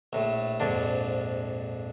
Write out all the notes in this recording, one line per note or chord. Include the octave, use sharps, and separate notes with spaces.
A#1 A2
A#1 F2 G#2 D4